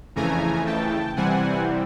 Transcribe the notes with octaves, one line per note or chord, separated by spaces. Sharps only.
F2 C#3 E3 A3 G#5 A#5
G5 A5
C3 E3 G3 C4 F#5 G#5